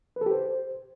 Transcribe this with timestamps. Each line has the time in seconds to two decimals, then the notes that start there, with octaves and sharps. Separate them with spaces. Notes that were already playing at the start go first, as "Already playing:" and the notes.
0.16 B4
0.21 A4
0.26 G4
0.31 C5